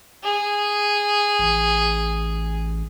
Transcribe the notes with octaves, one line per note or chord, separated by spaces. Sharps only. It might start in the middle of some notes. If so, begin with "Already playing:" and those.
G#4
A1